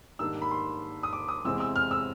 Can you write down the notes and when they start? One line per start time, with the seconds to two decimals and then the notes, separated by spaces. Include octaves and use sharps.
0.19 G#2 D#3 G3 A#3 D4 E6
0.42 B5
0.51 C6
1.03 D#6
1.13 D6
1.28 D#6
1.45 E2 C3 E3 G#3 C4 E6
1.60 E6
1.76 F6
1.91 E6